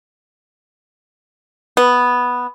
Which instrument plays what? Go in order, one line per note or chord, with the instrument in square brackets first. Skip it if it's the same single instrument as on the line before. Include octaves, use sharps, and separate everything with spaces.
[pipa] B3